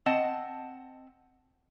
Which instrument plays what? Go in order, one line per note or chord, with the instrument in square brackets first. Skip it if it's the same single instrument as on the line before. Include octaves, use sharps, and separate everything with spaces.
[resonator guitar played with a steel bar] C4 D#5 F#5 A5